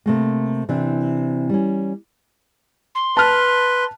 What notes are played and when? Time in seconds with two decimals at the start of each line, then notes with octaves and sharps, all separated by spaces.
0.06 C3 A3 A#3
0.69 C3 E3 C4 D4
1.49 G3 C#4
2.95 C6
3.17 B4 A5 F6